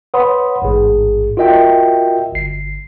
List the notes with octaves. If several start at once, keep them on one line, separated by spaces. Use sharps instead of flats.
B4 C#5 F#5 B5 C6 D#6
A1 G#2 G#4
F4 F#4 A#4 D#5 E5 G5
G1 C7